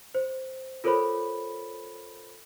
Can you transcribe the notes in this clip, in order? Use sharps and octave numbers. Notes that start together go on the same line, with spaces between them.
C5
F4 A4 A#4 C5 C#5 B5